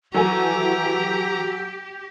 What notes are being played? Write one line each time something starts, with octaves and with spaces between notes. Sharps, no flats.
E3 F#3 G4 A4 G#5 A#5